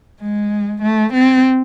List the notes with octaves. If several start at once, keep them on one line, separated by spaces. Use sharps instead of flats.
G#3
A3
C4